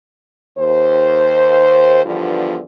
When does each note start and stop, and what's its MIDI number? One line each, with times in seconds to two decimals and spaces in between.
0.57 2.03 39
0.57 2.03 72
2.05 2.60 40
2.05 2.60 43
2.05 2.60 50
2.05 2.60 53
2.05 2.60 59
2.05 2.60 65